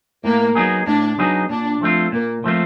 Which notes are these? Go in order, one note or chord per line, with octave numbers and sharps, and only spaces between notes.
A2 A#3
F#3 B3 D#4 G#4
A2 D4
F#3 B3 D#4 G#4
A#2 D4
F3 A3 C4 F4
A#2 A#3
F3 A3 C4 F4